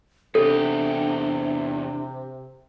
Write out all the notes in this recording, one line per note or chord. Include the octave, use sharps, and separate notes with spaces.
E2 C3 D4 G4 A4